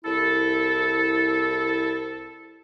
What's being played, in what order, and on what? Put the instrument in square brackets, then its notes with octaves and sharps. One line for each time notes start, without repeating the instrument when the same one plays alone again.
[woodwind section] C2 E4 A4